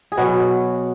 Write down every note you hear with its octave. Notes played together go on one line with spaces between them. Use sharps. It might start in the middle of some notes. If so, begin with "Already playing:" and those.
G#4
B2 F#3 F#4